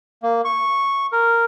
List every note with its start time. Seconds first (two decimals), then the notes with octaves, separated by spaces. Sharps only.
0.23 A#3
0.45 C#6
1.12 A#4